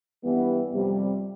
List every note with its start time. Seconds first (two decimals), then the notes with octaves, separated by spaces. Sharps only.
0.23 G2 E3 G3 B3
0.73 F2 C3 G3